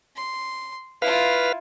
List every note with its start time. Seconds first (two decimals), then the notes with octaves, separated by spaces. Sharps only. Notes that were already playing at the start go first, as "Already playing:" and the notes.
0.16 C6
1.02 E4 F4 B4 F5